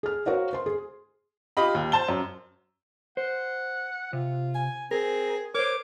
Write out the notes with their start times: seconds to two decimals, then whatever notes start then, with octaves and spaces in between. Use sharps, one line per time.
0.03 G#4 F6
0.26 F#4 A#4 C5 C#5 F5 F#5
0.53 C5 C6
0.66 G#4
1.57 F4 G4 D#5 B5
1.75 D#2
1.92 C5 A5 G7
2.09 F#2
3.17 C5 F#5
4.13 C3 F4
4.55 G#5
4.91 C4 G#4 A#4
5.55 A#4 C5 C#5 D6